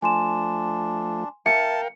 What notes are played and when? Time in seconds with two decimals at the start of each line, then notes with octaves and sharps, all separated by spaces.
0.02 F3 A3 D4 G#5 C6 E7
1.46 A#4 E5 F5 G5 A5 C#7